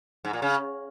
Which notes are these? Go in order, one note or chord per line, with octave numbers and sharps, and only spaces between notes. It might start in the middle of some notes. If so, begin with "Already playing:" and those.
G#2
A#2
C#3